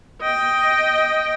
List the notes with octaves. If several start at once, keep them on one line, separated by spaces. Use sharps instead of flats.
D#5 G5